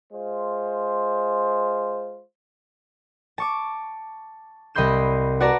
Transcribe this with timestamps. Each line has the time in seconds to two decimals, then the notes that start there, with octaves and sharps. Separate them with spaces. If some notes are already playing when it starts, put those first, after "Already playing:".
0.12 G#3 F4 C5
3.38 A5 C#6 D6
4.75 C2 D#5 B5 C6 G6 E7
5.40 F#4 B4 D5 A5 A#5